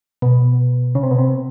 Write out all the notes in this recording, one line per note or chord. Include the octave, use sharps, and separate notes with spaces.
B2
C#3
C3
B2
C3